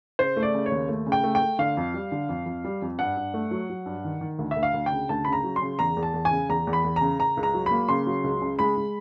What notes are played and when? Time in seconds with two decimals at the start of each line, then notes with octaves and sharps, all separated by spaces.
0.19 C#3 C5
0.37 A3
0.43 D5
0.54 C#3
0.66 C#5
0.72 D#2
0.89 A3
1.07 C#3
1.12 G5
1.24 A3
1.35 G5
1.42 A3
1.59 D3 F5
1.77 F2
1.94 G3
2.12 D3
2.29 F2
2.46 F2
2.65 G3
2.82 F2
2.99 G2 F#5
3.17 G2
3.34 A3
3.51 F#3
3.70 F#3
3.86 G2
4.04 D#3
4.21 D#3
4.39 D2
4.51 E5
4.56 D2
4.63 F5
4.74 D2
4.86 G5
4.92 C#3
5.09 D2 A5
5.25 C#3 B5
5.33 A#5
5.44 F#3
5.56 C6
5.62 C#3
5.79 E2 A#5
5.97 E2
6.03 A5
6.14 E2
6.25 G#5
6.31 C#3
6.49 E2 A#5
6.67 E2
6.73 B5
6.84 E2
6.96 C#3 A#5
7.19 C#3 A#5
7.37 C#2
7.43 A#5
7.54 F#3
7.66 A#3 B5
7.89 C#3 C6
8.07 F#3
8.24 C#2
8.42 C#3
8.59 G#3 B5
8.77 G#3